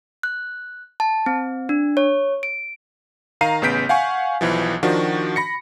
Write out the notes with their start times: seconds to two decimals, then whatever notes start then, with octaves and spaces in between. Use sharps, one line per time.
0.23 F#6
1.00 A5
1.26 C4
1.69 D4
1.97 C#5
2.43 D7
3.41 D#3 F5 A#5 C7 D#7
3.62 A1 C#3 B3 G6 B6 D7
3.89 F5 F#5 G#5 C#6
4.41 B1 E3 F3
4.83 D#3 F3 D4 F#4
5.36 B5 A#6 C#7